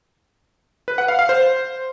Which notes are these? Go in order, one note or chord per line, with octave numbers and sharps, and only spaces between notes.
B4
F#5
F5
F5
C5